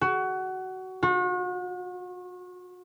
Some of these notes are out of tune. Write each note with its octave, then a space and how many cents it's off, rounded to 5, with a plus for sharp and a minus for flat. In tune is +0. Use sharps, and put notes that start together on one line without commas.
F#4 +20
F#4 -40